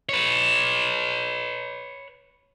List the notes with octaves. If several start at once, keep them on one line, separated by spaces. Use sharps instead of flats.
B4 C#5